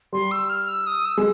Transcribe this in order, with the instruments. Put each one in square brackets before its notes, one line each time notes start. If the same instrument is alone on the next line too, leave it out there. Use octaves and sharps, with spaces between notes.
[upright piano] G3 [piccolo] C6
[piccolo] E6
F6
E6
D#6
E6
[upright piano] G#3